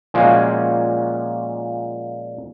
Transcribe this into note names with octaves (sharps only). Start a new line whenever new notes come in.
A#2 F3 G#3 A#3 C#4 F#4